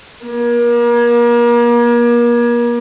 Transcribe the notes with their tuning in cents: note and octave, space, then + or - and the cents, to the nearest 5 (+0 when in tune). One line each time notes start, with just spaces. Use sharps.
A#3 +35